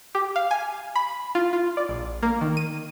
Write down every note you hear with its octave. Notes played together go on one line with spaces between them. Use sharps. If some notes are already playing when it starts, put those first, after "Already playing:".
G4
F5
G#5
B5
F4
F4
D5
A#1
A#3
D#3
D#7